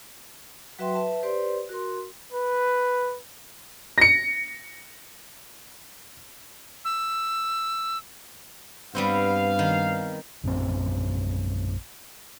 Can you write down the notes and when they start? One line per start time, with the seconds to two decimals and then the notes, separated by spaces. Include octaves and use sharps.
0.79 F#3 F#4 B4 E5 G5 C6
0.94 B4 E5 A5
1.23 G4 B4 C5 D5 C6
1.69 F#4 A#4 C6
2.32 B4
3.98 A#6 C#7
6.85 E6
8.95 G2 G3 B3 C4 F5
9.59 D#3
10.44 A#1 F#2 E3 C4